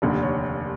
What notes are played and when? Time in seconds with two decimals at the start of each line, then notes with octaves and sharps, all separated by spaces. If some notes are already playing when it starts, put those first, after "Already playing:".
0.02 F1 D#2 D3
0.23 C#5